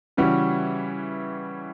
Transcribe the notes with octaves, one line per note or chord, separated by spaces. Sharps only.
C#3 E3 G3 C#4 F#4